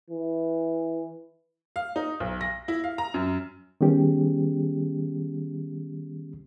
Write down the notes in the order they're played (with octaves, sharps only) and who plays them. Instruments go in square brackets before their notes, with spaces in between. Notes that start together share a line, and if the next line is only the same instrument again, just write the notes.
[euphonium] E3
[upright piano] F5
D#4
B1
A#6
E4
F5
A#5
F#2
[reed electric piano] D#3 G3 B3 C#4 G4 G#4